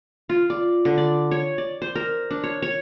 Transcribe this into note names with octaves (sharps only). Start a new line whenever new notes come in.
F4
D5
D3
D5
C#5
D5
C5
A#4
D4
C#5
C#5